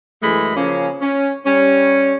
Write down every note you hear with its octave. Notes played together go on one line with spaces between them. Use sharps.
F#2 E3 G#3 A3 B5
C#3 F3 A#3 C#4
C#4
G3 C#4